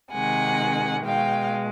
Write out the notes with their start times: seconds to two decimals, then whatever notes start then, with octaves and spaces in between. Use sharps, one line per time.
0.13 C3 D#3 G#3 F#5 G#5
1.05 B2 G#3 F5 G5